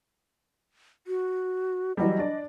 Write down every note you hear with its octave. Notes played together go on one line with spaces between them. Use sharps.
F#4
E3 F#3 G3 D#5
D4 D5